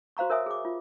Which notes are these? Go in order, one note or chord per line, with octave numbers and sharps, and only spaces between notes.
F#4 C5 F5 A#5 C#6
A#4 C#5 E5 G#5 D#6
G#4 D6
F4